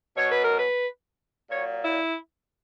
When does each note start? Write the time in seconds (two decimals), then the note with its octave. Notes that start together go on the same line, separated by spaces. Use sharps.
0.17 B2 F#3 C#5
0.31 B4
0.44 A#4
0.58 B4
1.50 A#2 F#3 C#5
1.84 E4